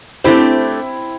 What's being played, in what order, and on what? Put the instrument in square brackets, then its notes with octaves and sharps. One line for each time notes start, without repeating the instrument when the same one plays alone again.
[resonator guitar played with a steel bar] A3 D4 G4 C5 [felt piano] C4 E4